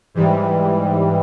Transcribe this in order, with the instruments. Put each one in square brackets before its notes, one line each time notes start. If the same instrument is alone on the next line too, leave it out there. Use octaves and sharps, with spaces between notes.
[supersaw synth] G#2 E3 G3